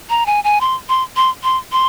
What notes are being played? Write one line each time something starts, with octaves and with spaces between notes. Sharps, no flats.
A#5
G#5
G#5
C6
C6
C6
C6
C6